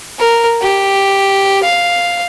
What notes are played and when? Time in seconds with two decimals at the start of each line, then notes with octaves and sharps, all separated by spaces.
0.19 A#4
0.62 G4
1.63 F5